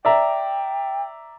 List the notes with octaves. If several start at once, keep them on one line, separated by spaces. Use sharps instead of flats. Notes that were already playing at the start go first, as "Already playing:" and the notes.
D5 E5 G5 A#5